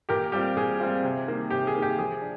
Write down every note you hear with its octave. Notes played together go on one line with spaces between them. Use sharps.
A#2 G4 A#4
G3 C4 F4 G4
A#2 G#4
G3 C4 F4
C3
D#3 A#3
C3 G4
G#4
D#3 A#3
G4
F3 G#4
D4